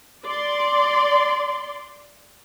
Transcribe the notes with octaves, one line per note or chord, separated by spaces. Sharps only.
D5 C6